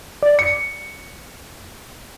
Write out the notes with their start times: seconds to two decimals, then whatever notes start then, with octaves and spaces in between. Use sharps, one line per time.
0.22 D5
0.39 C#7